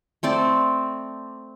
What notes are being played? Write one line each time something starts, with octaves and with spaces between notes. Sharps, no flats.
A3 C4 D5